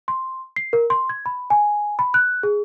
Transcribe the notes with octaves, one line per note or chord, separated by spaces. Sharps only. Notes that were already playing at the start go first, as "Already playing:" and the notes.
C6
C7
A#4
C6
G#6
B5
G#5
B5
F#6
G#4